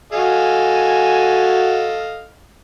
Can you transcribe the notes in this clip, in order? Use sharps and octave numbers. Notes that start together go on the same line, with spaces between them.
F#4 A4 D#5 F5 G#5